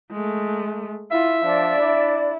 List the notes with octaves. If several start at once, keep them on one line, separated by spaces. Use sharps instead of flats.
G#3 A3
E4 F4 E5
F3 D4 D5
E4